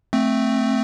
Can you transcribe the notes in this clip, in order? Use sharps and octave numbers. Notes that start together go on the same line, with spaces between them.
A3 C4